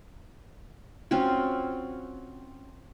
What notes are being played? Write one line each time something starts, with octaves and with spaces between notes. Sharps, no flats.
C4 C#4 F4 F#4